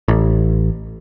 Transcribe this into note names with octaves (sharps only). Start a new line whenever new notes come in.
A1